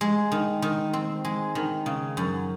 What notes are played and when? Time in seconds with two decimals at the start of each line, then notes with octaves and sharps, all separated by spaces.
0.01 G#3
0.32 D#3
0.62 D#3
0.93 C4
1.25 G#3
1.55 D#3
1.86 C#3
2.17 F#2